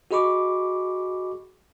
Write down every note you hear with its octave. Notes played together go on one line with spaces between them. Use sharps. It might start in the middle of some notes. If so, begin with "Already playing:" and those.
F#4 G#4 D#5 B5 C#6 D6